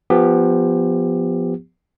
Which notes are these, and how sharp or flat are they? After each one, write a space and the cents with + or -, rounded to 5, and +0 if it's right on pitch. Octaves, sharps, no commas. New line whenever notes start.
F3 +0 B3 +0 G4 +20